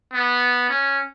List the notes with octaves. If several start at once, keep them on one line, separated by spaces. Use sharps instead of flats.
B3
C#4